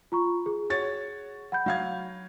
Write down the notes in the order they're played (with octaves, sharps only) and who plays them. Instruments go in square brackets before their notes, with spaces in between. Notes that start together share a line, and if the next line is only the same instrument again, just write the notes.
[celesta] F4 A#5 C#6
G#4
[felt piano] F#4 C#5 A6
[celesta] F#5 B5 G6
[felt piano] F#3 F5 G#6